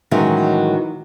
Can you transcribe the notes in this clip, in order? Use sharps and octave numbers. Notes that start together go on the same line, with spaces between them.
A2 D#3 E3 F#3 G#3 C#4